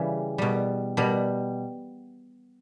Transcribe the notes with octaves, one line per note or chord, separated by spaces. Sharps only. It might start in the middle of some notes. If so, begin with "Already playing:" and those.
Already playing: C#3 E3 G3
B2 G3
B2 G3